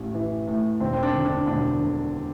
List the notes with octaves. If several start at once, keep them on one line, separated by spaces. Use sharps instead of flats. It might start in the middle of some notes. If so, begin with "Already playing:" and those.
Already playing: A1 A2
E3
A2
E1 C4
C4
D4
D3
D4
E1 D4
D3